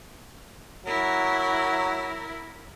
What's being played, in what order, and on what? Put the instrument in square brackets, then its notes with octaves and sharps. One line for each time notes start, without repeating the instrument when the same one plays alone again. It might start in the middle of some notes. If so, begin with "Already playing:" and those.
[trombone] F#3 [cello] E4 A#4